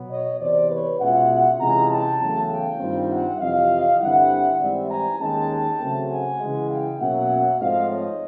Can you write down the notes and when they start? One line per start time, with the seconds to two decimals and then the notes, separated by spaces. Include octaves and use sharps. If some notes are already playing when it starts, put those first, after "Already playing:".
Already playing: B2 F#3 B3
0.11 C#5 D#5
0.40 E2 C3 E3 C5 D5
0.70 B4 C#5
1.00 B2 G#3 C#4 F4 E5 F#5
1.60 C3 E3 G#3 C#4 F4 G#5 A#5
1.90 G5 A5
2.20 E2 C#3 F#3 A3
2.50 F5 G5
2.80 G2 D#3 G3 C4 F4
3.10 E5 F#5
3.40 F2 C3 E3 D#5 F5
4.00 G2 D3 G3 C4 E4 E5 F#5
4.59 G#2 E3 G3 C4 E4 D5 E5
4.90 G#5 A#5
5.20 D#2 D#3 G#3 C#4 G5 A5
5.79 C#3 F#3 A3 C4
6.10 F#5 G#5
6.39 C#3 E3 G#3
6.69 F5 G5
6.99 B2 F#3 A#3 C#4 E5 F#5
7.59 G#2 F3 A3 C4 D#5 F5
7.90 C#5 D#5